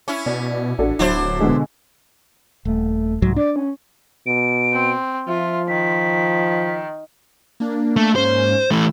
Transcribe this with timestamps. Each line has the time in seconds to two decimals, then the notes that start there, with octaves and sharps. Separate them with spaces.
0.08 C#4 E4
0.26 B2 D5
0.79 A1 D4 F#4 A4
0.99 D1 F#3 D4 E4 C5
1.40 B2 D3 G#3
2.65 D#1 A3
3.22 C2 G#2 F#3
3.36 D4 D5
3.56 C#4
4.27 B2 D7
4.72 C4
5.28 F3 F4 E5
5.68 D#3 B6
7.60 A#3 D4
7.96 A3
8.16 G#2 A#3 C#4 C5
8.71 E3 A3 E6